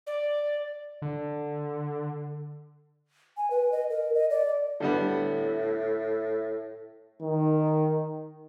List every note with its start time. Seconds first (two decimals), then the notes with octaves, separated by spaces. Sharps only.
0.07 D5
1.02 D3
3.37 G#5
3.50 B4
3.72 D#5
3.90 A#4
4.15 D#5
4.30 D5
4.80 A2 D3 G3 B3
7.22 D#3